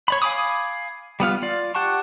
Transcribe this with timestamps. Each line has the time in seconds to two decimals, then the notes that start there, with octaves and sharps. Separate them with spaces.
0.08 C#5 D5 B5
0.22 F5 G#5 B5 D6 D#6
1.20 G3 B3 F4 F6
1.42 F4 D5
1.75 G4 F#5 A5 C#6